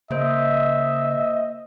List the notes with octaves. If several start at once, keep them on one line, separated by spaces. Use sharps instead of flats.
C#3 A#3 C5 D#5 E5